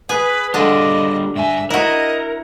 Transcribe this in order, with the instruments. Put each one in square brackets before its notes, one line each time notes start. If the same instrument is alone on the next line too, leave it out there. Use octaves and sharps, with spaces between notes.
[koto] G#4 G#5 [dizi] B4
[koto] D3 D4 [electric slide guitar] G3 F4 [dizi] D#5
[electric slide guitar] G2 G#5 [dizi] E5
[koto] E4 F#4 [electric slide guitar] A#4 [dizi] D#5